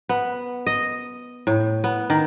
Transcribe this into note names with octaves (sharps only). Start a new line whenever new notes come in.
B3
D#5
A2
B3
D#3